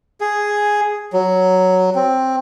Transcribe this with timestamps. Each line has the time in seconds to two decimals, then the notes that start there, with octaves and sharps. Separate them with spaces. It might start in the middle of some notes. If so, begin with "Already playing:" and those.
0.21 G#4
1.13 F#3
1.95 C4